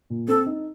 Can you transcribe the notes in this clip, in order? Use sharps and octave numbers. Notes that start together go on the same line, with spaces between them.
A#2
C4 A4
D#4